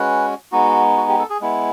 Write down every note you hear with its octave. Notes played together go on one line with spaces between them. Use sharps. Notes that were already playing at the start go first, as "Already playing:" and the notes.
Already playing: G#3 C#4 F#4 B4
G#3 B3 D#4 F#4
F#4
G4
A4
G#4
G#3 B3 E4